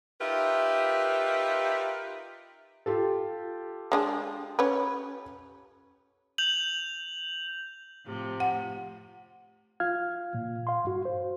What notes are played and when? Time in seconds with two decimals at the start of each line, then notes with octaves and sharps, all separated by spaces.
0.20 D#4 F4 G4 A#4 B4 E5
2.86 F4 G4 A4
3.92 G#3 D4 G#4
4.59 C#4 B4
6.38 G6 F7 F#7
8.04 A2 C3 F3
8.40 F#5
9.80 F4 F5 F6 G#6
10.34 A#2
10.67 F5 C6
10.85 G2 F#4
11.05 C5